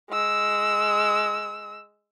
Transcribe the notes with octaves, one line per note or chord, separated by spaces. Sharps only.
G#3 E6